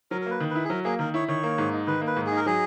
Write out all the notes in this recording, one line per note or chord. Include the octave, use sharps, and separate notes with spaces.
F#3 A#4
A#4
A#3 B4
D#3
B4
E4
G#4
F#3 A#4
A#3 G#4
D#3 A#4
E4 C#5
D#3 C#5
A#3
G#2
D#4
D#3 B4
A#3
B4
G#2
D#4 G#4
A#4
F#3 G#4